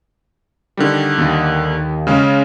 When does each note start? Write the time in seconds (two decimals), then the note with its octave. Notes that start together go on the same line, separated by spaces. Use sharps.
0.77 D3 D#3 G3
1.18 D#2
2.07 C#3 G#3 C#4